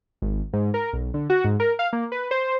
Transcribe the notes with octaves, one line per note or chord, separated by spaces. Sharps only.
G#1
G#2
A#4
B1
D3
F#4
G#2
A#4
F5
A#3
B4
C5